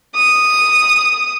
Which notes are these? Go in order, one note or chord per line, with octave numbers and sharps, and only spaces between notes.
D#6